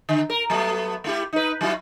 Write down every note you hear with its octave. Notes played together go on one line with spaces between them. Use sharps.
D3
A#4
F#3 A3 B3
A3 E4 G4
D#4 B4
F#3 E4 F#4